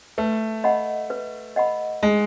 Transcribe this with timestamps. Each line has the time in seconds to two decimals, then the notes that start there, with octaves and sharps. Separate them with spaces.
0.18 A3 B4
0.64 D#5 F#5 B5
1.10 B4
1.56 D#5 F#5 B5
2.03 G#3 D#4